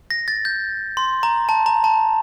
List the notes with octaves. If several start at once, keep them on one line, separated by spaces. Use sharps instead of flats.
A#6
A6
G6
C6
A#5
A5
A#5
A5